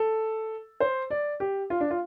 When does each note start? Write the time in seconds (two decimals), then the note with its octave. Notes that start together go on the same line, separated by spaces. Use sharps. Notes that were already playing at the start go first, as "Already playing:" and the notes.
Already playing: A4
0.80 C5
1.10 D5
1.40 G4
1.70 F4
1.80 D4
1.91 F4